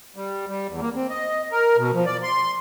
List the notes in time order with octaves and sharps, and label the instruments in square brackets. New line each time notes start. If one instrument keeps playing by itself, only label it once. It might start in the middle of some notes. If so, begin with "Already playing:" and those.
[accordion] G3
G3
E2
A#3
C4
D#5
A#4
B2
F3
D5
C6